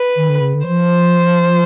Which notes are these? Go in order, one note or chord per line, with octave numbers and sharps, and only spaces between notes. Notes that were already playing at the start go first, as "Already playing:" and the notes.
Already playing: B4
D#3
D3
C#3
D3
F3 C5